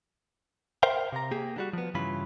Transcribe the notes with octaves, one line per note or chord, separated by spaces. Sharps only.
A#4 C5 E5 F5 G5
C3 A#5
A#3 G4 G#4
D3 G3 F#4
F3 B3
G2 C#3 E3 F4 B5